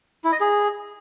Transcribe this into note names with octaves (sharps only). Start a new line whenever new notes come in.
E4
D#5
G#4